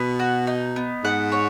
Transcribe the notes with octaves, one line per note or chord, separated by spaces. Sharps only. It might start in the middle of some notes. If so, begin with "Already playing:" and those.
Already playing: B2 B3
F#4
D#4
B3
G#2 F#5
C#5